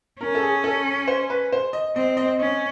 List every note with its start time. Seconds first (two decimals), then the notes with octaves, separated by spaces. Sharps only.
0.20 C#4 A#4
0.35 A4
0.42 G#4
0.64 A4
1.08 C5
1.30 B4
1.52 C5
1.73 D#5
1.96 C4 D#5
2.17 D#5
2.39 C#4 D#5